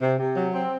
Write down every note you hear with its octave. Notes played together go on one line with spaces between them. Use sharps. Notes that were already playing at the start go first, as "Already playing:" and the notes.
C3
C3
F#3
C4